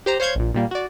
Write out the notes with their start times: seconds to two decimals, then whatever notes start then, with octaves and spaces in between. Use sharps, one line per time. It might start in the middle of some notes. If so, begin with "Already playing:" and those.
0.06 G4 C5 A#5
0.20 C5 C#5 F5 G6 G#6
0.35 A#1 A#2
0.54 A#2 G3 A#3
0.71 F#4 D5